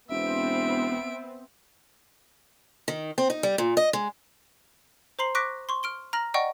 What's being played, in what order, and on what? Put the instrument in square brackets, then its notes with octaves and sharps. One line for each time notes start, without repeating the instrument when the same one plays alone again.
[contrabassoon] E1 [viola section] B3 C4 [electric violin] E5 D7
[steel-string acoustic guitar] D#3
C4
D#4
G3
A#2
D#5
G#3
[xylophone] C5 A#5 C6 C7 F#7
C#6 D6 F#6 A#6 B6 D7
C6 C#6
F6 D7 G7
A#5 F6 A#6 F#7
D5 D#5 F#5 G5 C#6